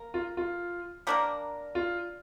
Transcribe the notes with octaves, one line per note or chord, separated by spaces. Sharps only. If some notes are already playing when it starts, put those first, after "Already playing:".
Already playing: A#3 A#4
F4
F4
G3 A#3 D4 A#4
F4